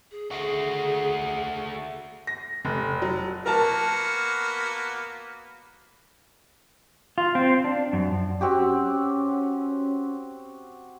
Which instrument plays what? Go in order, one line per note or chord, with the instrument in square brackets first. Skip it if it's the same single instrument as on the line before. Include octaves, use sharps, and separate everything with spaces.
[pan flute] G#4
[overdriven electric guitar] A3 F#4 [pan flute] G#4
[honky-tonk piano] A#6
F1
F#3
[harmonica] A#3 B3 F#4 [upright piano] A#4 A5
[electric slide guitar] F4
C4
D4
F#2
[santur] C4 F#4 G4 [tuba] C#4